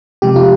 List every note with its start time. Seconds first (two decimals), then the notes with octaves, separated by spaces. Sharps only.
0.22 C3 F3 G#3 G4
0.36 F4